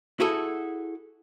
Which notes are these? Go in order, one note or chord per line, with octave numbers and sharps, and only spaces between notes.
E4 F#4 G#4 A4